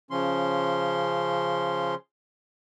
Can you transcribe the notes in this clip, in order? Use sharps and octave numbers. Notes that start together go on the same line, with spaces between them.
C#3 F3 C#4 C6